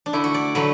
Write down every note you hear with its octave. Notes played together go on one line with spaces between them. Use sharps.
D4
D3 A3 E4
F#4
D5
D3 F#3 A3 B4